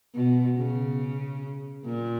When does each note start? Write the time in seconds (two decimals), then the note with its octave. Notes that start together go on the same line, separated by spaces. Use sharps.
0.15 B2
0.57 C#3
1.85 A#2